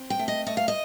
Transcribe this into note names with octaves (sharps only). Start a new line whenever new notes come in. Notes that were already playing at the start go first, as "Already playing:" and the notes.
Already playing: C4
G5
A3
D#5
A3 D#5
F5
D#5